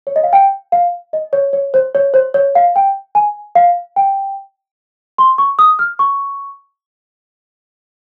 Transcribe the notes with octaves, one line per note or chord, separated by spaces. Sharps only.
C#5
D#5
F5
G5
F5
D#5
C#5
C#5
C5
C#5
C5
C#5
F5
G5
G#5
F5
G5
C6
C#6
D#6
F6
C#6